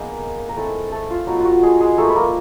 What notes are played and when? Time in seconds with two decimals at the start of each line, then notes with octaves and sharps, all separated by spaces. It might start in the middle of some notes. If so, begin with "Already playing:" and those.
Already playing: G#3 A#3 B3 D#4 A#4
0.49 A#4
0.57 G#3 A3 C4 E4 A4
0.92 A3 A4
1.10 F4
1.27 F#3 B3 D#4 F#4
1.40 F4
1.45 F#4
1.63 G#3 G#4
1.81 G#3 G#4
1.98 F3 A3 A#3 D#4 A4
2.09 B4
2.16 A#3 A#4